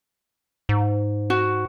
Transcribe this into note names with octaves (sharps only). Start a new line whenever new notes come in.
G#2
F#4